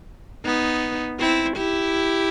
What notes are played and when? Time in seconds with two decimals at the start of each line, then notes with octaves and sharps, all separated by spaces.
0.45 B3 D#4
1.19 C4 E4
1.57 E4 G4